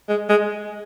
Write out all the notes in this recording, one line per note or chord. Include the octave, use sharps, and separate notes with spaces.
G#3
G#3